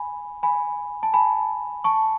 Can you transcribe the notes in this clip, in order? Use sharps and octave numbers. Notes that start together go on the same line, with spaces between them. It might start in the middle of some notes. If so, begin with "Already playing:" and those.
Already playing: G#5 B5
G#5 B5
A5
G#5 B5
A5 C#6